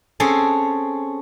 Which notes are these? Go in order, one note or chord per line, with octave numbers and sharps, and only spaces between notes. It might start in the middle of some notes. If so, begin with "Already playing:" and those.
C4 C#4 G#4 A4